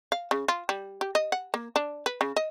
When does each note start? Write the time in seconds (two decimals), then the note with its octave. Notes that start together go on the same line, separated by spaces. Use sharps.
0.12 F5
0.31 C#3
0.48 F4
0.69 G3
1.01 G4
1.15 D#5
1.32 F#5
1.54 A#3
1.76 D4
2.06 B4
2.21 C#3
2.36 D#5